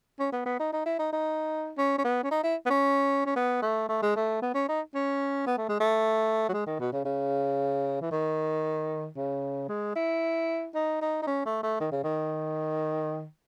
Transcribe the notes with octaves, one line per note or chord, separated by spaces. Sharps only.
C#4
B3
B3
D#4
D#4
E4
D#4
D#4
C#4
C#4
B3
C#4
D#4
E4
B3
C#4
C#4
B3
A3
A3
G#3
A3
B3
C#4
D#4
C#4
B3
A3
G#3
A3
F#3
G#3
D#3
B2
C#3
C#3
E3
D#3
C#3
G#3
E4
D#4
D#4
D#4
C#4
A3
A3
D#3
C#3
D#3